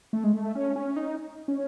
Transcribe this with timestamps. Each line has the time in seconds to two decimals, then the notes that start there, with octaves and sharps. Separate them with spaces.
0.13 A3
0.24 G#3
0.33 A3
0.55 C#4
0.76 C#4
0.96 D#4
1.48 C#4